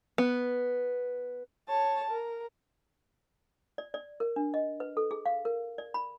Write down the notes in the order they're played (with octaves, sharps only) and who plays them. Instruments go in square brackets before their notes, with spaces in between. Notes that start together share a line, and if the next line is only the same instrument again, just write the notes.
[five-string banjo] B3
[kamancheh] C#5 A5
A#4
[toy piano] D5
D5
A#4
D4
D#5
B4
A4
G#4
F5
A#4
D5
B5